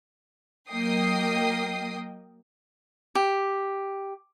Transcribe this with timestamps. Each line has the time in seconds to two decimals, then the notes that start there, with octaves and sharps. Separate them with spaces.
0.70 F#3 A#3 D#5 G5 D#6 C7
3.15 G4